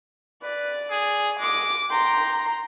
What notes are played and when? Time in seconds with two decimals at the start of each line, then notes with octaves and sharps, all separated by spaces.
0.43 B4 D5
0.91 G#4
1.39 G#3 D6
1.90 G5 A#5 C6